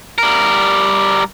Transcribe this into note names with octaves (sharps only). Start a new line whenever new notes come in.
G3 A#4